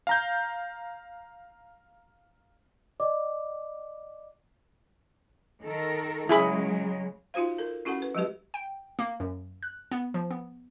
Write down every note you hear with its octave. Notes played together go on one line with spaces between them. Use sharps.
F5 A#5 G6
D5 D#5 D6
D#3 A4 A#4
C#3 F#3 G#3 E4 G#4 B5
D#4 F4 F#4 C5 F5
A4 A#4
C#4 E4 F#4 A4 F#5
B4
F3 F#3 G#3 F#4 G4 B4
G5
A#3
F#2
F#6
B3
F3
B3